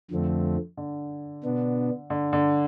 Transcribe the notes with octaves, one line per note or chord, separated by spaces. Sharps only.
F2 D3 F3 A3 C4
D3
B2 B3 D4
D3
D3